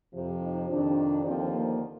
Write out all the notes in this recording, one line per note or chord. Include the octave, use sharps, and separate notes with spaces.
F2 C3 F3
D#4
F2 C3 D#3 D4
D#2 D3 F3 C4
A#3